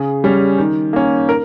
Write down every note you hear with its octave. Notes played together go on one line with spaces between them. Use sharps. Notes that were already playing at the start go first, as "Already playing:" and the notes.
Already playing: C#3 G#4
G3 C#4
D#3
A#3 C#4
A#4